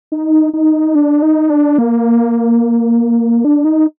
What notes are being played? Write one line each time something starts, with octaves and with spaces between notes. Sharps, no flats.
D#4
D#4
D4
D#4
D4
A#3
D4
D#4